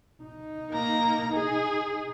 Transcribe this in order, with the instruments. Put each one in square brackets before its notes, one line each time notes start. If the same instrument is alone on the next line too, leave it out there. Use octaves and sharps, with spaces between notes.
[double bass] D#4
[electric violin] A#3 A#5
G#4